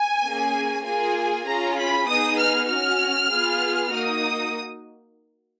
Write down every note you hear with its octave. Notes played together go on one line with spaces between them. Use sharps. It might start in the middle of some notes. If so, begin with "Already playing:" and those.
Already playing: G#5
A#3 C#4 G#4
A#3 F4 G#4 G#5
C#4 F4 G#4 A#5
B5
B3 D#4 G#4 D#6
F6
C#4 F#4 F6
B3 F4 G#4
A#3 D#4 F#4 D#6